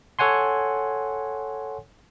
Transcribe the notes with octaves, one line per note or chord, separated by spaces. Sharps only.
A4 C#5 F#5 G#5 C6